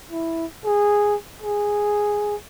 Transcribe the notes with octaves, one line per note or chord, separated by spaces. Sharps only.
E4
G#4
G#4